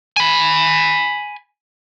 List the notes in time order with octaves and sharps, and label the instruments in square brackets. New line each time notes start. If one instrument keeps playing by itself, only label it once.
[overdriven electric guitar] G#5 B5